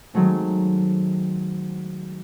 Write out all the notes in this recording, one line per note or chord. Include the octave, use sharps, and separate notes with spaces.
D#3 F#3 G#3 A3 C4